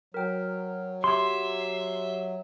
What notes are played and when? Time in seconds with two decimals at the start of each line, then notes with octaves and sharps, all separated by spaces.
0.14 F#3 A#4 G5
1.04 G4 E5 C6 G#6